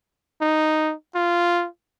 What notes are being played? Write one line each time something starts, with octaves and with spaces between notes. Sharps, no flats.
D#4
F4